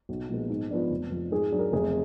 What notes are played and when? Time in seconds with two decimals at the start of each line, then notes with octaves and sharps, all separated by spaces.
0.09 B1
0.29 A#2 F3 G#3 B3
0.50 G#2
0.70 F3 B3 D4
0.90 F1
1.10 F2 F3
1.31 G#2 G#4
1.52 F#3 D4
1.59 A#4
1.73 F1 G#4